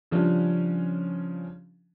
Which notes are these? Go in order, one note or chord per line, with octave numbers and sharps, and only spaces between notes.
C#3 F3 G3 C#4 D4